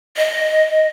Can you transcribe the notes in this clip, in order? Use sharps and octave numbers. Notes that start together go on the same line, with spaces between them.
D#5